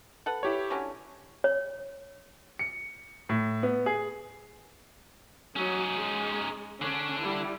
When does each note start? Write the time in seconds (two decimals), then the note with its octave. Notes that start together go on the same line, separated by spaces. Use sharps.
0.26 A4 B4 F#5
0.43 E4 G4 C#5
0.70 D3 F#3 C#4
1.44 C#5
2.59 C#7
3.29 A2
3.63 B3
3.86 G#4
5.56 F#3 C#4 D#4
5.93 G#3
6.82 D3 C#4 D4
7.20 G3 E4